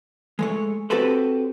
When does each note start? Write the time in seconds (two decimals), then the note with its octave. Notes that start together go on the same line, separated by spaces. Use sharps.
0.39 G#3 A3 C#5
0.90 C4 F#4 G4 A4 B4 C5